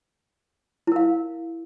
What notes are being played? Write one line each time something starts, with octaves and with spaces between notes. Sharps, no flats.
E4 A#4 F5